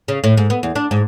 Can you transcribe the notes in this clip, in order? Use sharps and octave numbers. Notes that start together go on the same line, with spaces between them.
C#3
A2
G#2
B3
E2
D4
G#2